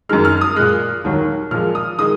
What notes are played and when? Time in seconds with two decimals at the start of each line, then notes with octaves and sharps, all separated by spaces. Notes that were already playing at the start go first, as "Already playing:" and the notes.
0.09 F#2 D#3 G#3 F6
0.25 F6
0.41 D#6
0.56 A#2 G#3 F#6
1.04 D#2 D#3 F#3
1.51 A#2 F3 G#3 F6
1.75 D#6
1.98 D#3 G#3 D#6